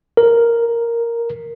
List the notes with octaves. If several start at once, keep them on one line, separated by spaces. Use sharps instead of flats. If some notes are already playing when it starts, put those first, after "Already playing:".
A#4